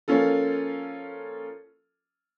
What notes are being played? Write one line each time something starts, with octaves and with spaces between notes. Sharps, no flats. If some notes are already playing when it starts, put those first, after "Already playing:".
F3 A#3 C#4 F4 A4